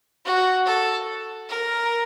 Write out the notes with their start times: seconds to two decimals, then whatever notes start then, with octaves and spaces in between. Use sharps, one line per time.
0.26 F#4
0.66 A4
1.50 A#4